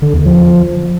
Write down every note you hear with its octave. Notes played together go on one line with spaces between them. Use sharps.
D3
E2
F3